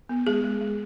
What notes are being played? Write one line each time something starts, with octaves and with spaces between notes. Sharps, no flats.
B3
G#3 G#4
G#3
G#3